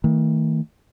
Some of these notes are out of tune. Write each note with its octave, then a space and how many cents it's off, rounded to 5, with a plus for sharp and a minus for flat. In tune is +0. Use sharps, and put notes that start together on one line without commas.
D#3 +40 A3 +35